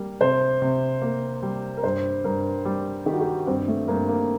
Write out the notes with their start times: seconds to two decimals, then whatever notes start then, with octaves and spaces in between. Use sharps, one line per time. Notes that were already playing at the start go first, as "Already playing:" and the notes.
Already playing: G3 A#3
0.21 C3 C5
0.62 C3
1.02 A#3
1.42 G3
1.77 A#4
1.83 G2 C5
2.24 G2 A#4
2.65 G3
3.06 D#3 G4
3.13 F#4
3.21 G4
3.47 G2 C4
3.68 A3
3.88 G2 A#3
4.08 A#3